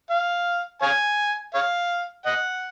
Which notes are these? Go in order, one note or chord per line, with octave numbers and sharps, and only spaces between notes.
F5
C#5 F5 G#5
C#5 F5
D#5 F#5